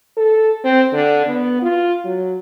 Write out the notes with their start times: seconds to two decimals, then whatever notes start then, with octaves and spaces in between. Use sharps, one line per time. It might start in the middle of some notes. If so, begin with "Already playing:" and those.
0.17 A4
0.64 C4
0.93 D3
1.26 B3
1.62 F4
2.05 F#3